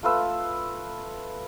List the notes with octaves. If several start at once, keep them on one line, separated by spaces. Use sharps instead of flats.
A3 F4 B4 E6